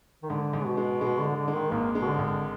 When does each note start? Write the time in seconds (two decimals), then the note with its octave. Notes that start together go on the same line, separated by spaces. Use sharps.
0.23 D#3
0.30 G#2 D3
0.53 G#2
0.65 B2
0.77 G#3
1.01 B2 G#3
1.19 D3
1.24 G#3
1.36 D3
1.48 G#3
1.54 D#3
1.71 G#1 A#3
1.95 G#3
2.02 B2
2.07 D3
2.18 G#1
2.24 D3